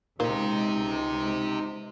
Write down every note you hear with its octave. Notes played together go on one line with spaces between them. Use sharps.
C#2 A#2 D#4 G4 C5